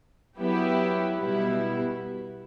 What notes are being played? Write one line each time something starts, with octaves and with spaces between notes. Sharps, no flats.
F#3 B3 E4 G4
B2 G3 B3 E4